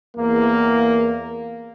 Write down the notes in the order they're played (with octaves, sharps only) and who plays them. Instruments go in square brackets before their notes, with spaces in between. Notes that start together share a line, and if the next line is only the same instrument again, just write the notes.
[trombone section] E2 A#3